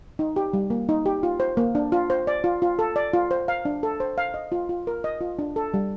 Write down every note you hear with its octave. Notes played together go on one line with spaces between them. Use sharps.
D#4
G4
G3
A#3
D#4
G4
F4
C5
A#3
D4
F4
C5
D5
F4
F4
A4
D5
F4
C5
F5
D4
A4
C5
F5
D#5
F4
F4
A#4
D#5
F4
D4
A4
G3